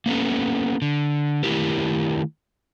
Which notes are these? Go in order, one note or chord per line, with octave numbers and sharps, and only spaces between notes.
A#3 B3 C#4 A4
D3
D#3 E3 A3 E4 G4 A#4